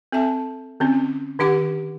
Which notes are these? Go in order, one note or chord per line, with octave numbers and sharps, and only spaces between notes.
C4 A4 E5 A5
D3 C4 C#4
D#3 D4 G4 F#5 D6